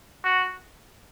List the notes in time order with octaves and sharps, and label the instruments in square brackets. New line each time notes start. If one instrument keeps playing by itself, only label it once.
[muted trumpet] F#4